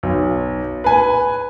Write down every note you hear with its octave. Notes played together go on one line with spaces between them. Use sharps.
B1
B4 G#5